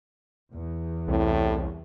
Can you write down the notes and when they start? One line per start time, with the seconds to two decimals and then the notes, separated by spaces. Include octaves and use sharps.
0.56 E2
1.08 C2 A2